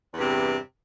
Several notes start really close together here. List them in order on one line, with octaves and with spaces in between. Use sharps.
E2 G2 C3